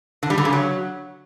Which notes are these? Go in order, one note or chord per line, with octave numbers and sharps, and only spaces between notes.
D3
G3
D3
C#3
F#3